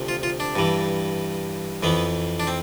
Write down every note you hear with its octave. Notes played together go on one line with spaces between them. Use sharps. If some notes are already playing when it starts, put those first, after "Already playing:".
Already playing: D2 C3 F3
F4
F4
D4
G2 E3
F2 E3 B3
D4
C4